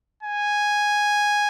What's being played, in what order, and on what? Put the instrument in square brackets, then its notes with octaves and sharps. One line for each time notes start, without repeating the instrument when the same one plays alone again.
[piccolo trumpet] G#5